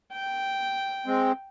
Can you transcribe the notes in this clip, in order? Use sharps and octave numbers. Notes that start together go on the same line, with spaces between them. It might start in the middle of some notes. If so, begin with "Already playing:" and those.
G5
G#3 C4